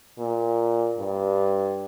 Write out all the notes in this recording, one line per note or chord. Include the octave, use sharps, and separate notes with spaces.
A#2
G2